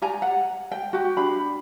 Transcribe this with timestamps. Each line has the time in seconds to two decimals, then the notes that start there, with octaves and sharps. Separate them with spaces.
0.02 G4 D5 G#5 A#5
0.22 F#5
0.72 G5
0.93 F#4 G4
1.17 D4 B5